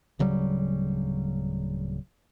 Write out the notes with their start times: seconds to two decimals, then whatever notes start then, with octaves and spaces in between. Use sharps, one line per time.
0.19 D1 C#3 F#3 G3